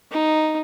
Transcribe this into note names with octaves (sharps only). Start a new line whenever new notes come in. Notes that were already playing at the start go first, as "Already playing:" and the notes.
D#4